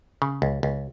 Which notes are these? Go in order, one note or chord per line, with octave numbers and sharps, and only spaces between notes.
C#3
C#2
C#2